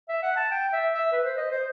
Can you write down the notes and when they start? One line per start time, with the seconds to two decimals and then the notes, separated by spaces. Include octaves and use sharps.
0.09 E5
0.23 F#5
0.36 A5
0.51 G5
0.73 E5
0.94 E5
1.12 B4
1.24 C5
1.37 D#5
1.52 C5